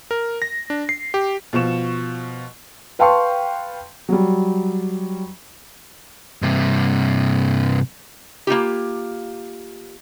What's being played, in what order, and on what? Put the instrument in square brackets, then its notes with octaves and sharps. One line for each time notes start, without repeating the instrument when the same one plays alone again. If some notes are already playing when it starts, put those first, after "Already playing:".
[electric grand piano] A#4
A#6
D4
C7
G4
[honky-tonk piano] B2 F3 F4 C#6 E7
[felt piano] B4 F5 G5 A5 C6 C#6
F#3 G3
[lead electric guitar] G2 C3
[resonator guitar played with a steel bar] A#3 D#4 F4 G4